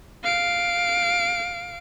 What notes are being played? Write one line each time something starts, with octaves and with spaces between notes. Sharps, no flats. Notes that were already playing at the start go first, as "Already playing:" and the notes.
F5 D7